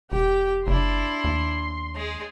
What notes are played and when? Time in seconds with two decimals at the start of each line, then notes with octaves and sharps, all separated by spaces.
0.12 E1 G4 G5
0.67 F#1 D4 E4 C6
1.24 D#2
1.95 G#3 G#4